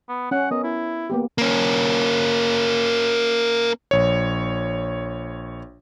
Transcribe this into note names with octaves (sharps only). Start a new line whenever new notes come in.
B3
C#4 F#5
B3 A#4 D#5
E4
A#3 B3 G4
A#3 C#4
A#1 C#5